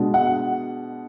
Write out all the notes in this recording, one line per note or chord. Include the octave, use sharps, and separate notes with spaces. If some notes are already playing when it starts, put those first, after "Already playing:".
Already playing: B2 G#3 D4
F#5